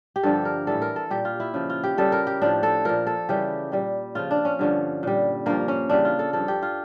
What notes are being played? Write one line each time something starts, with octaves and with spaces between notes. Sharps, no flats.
G4
G2 D3 F3 A4
A#4
A2 E3 G3 A4
A#4
A4
A#2 G3 G4
F4
E4
C#3 F3
F4
G4
C#3 G3 A4
A#4
G4
A2 F3 D4
A4
A#2 F3 A#4
A4
C#3 E3 G3 G4
A#2 G3
C#3 F3 F4
D4
C#4
G2 D3 F3
A#2 G3
G2 F3 A#3
C#4
C#3 E3 G3 D4
F4
A4
G2 F3 A4
G4
F4